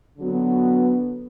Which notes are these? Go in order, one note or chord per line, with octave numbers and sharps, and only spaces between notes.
D3 F#3 B3 F#4